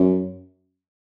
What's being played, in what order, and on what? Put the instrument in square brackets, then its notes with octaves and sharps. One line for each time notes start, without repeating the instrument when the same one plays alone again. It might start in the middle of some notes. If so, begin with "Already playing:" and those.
Already playing: [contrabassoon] F#2